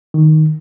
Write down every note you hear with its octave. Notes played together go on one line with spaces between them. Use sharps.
D#3